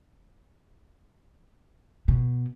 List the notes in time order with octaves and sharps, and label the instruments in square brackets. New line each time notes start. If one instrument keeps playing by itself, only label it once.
[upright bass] B2